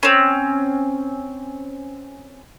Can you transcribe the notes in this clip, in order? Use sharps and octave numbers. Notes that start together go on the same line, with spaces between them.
C4 C#4